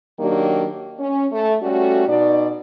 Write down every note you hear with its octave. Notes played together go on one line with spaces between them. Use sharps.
D#3 F#3 A#3 D4 G4
C#4
A3
G3 A3 C#4 F#4
B2 D#4 D5